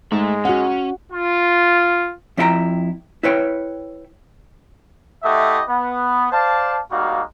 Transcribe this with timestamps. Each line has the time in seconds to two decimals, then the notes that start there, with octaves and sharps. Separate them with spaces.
0.12 G#2 G#3 A3
0.45 C#4 F#4 F#5
1.12 F4
2.37 F2 C#4 E4 F4 G5 A#5
3.23 E4 B4 C#5 G5
5.23 A3 E4 G4 D#5 E5 F#5
5.69 B3
6.32 C5 D5 F5 A5
6.91 G3 G#3 A#3 D#4 F#4 F5